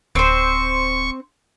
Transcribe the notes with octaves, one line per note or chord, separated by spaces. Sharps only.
D1 C4 C5 C#6